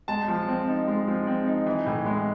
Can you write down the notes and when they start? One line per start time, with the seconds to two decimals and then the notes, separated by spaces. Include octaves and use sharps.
0.08 G#3 A5
0.28 F3
0.48 C4
0.68 D#4
0.88 G#3
1.07 F3
1.27 C4
1.47 D#4
1.66 E3
1.86 A2
2.06 G#3